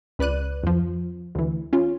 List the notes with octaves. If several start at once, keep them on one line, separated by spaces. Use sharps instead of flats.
C#2 B4 D5 F#6 D#7
F2 F3
D2 E3
C#4 F4